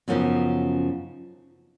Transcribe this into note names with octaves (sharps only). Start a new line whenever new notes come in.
F#2 C#3 F3 B3 D#4